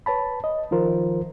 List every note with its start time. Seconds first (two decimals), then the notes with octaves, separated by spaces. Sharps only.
0.06 B4 C#5 A5 B5
0.44 D#5
0.71 D#3 F3 F4 A#4 C5